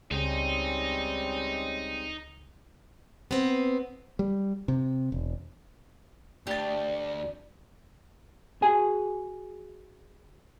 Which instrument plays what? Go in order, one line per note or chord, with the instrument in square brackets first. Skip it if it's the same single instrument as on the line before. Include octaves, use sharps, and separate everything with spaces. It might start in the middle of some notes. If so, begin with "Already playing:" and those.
[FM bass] C#2 [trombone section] G3 G#3 C4 [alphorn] C#4 [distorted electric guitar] D#4
[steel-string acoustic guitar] B3 C4
[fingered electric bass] G3
C3
E1
[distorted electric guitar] D2 [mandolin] G4 A5 [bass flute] D5
[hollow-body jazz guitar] F#4 G#4 G#5